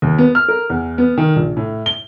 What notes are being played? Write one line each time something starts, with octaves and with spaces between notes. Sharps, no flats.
D#2
B3
F6
A#4
E2
B3
D#3
A#1
A2
G7